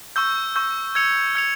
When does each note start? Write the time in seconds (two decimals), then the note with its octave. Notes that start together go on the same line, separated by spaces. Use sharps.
0.16 C#6 E6 G6
0.56 C#6 E6 G6
0.95 E6 G#6 C#7 F7
1.35 E6 G#6 C#7 F7